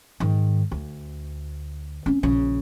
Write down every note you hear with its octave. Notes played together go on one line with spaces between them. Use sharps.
G#2 D#3
D2
C4 C#4
A#1 C#3